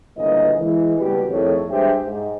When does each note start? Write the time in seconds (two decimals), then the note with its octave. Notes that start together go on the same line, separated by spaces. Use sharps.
0.17 G1 C#2 A#2 E3 A#3 D#5
0.59 E3 G#3
0.98 F#1 B2 G3 F#4 G4 B4
1.29 F2 A2 D#3 G#4 A4 C#5
1.69 G2 G#3 G4 C5 E5 G5
2.05 G#2